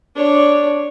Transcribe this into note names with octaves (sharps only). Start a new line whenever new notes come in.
D4 C#5